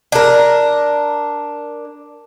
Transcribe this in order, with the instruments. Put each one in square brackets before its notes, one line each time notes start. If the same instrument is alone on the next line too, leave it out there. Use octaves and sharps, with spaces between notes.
[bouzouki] D4 A#4